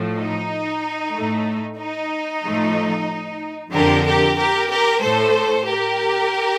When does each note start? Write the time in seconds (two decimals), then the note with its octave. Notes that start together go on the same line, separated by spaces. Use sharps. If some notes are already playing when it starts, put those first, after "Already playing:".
Already playing: A2 F3 A3
0.17 D#4
1.14 A2 A3
1.80 D#4
2.44 A2 F3 A3
3.73 F2 D3 F3 G4 A#4
4.06 G4 A#4
4.38 G4 A#4
4.70 G4 A#4
5.02 A2 A3 A4 C5
5.67 G4 A#4